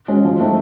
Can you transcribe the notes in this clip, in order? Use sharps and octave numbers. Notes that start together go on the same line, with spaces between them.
G#3 C#4 F#4
F3
A3 C4 D#4